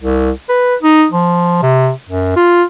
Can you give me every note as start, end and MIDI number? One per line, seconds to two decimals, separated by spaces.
0.01 0.31 36
0.49 0.75 71
0.82 1.06 63
1.11 1.61 53
1.62 1.91 48
2.09 2.35 42
2.36 2.63 65